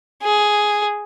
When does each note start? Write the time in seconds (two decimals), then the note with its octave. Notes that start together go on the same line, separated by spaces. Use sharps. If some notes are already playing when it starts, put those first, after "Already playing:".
0.23 G#4